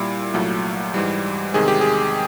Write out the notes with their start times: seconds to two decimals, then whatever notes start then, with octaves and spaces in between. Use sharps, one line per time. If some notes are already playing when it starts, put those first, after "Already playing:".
Already playing: A#2 G3 E4
0.34 C2 A#2 F#3 A3
0.94 G#2 E3 G3
1.54 E2 C3 D#3 G#3 G#4
1.68 G4
1.81 G#4